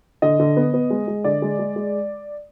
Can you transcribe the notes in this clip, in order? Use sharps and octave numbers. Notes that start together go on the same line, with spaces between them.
D3 D#5
D3
B3
B3
G#3
G#3
D3 D5
G#3
G#3
G#3